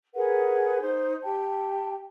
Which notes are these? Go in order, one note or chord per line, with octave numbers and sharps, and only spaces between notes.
G#4 A#4 B4 F#5
D#4 C5
G4 G5 A5